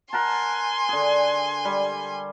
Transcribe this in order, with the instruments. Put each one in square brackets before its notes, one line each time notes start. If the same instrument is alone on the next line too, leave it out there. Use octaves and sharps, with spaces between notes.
[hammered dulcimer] A#4 F#5 A5 [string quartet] G#5 C6
[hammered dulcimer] D3 G#4
G3